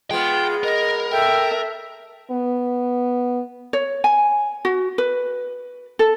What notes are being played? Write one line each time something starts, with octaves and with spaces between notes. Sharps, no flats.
G#3 B3 F4 G5
A#4 D#5
A4 E5 G5
B3
C#5
G#5
F#4
B4
A4